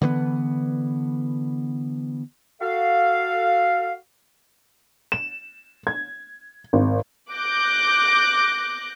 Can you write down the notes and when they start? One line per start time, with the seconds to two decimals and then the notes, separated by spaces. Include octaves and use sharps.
0.02 D3 E3 G#3 B3
2.61 F#4 A4 F5
5.12 E7
5.87 G#6
6.73 G#1
7.31 D6 F#6 G6 A#6